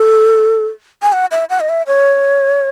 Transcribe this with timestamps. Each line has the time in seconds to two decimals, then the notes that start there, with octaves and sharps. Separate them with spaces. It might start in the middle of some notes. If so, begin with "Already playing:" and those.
Already playing: A4
1.02 G#5
1.13 F#5
1.31 E5
1.50 F#5
1.60 D#5
1.69 E5
1.87 C#5